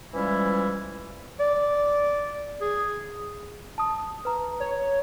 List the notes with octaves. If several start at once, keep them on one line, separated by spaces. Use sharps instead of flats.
E3 F3 G3 G#3 C#4 E4
D5
G#4
A5 D#6
B4 A#5
C#5